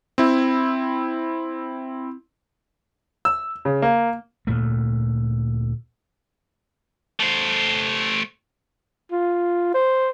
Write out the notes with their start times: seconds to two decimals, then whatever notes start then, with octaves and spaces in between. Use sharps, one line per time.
0.18 C4 E4
3.25 E6
3.65 C#3
3.82 A#3
4.47 D2 A#2 A3
7.20 A3 C5
9.11 F4
9.74 C5